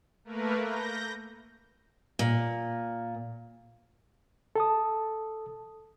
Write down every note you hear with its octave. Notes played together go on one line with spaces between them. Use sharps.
A3 A#3 A#4 B4
G6 A#6
A#2
A4 A5 D#6